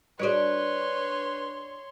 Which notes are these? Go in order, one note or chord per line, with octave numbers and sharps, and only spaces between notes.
G3 D4 F#4 G#4 B4 C#5 D5 C6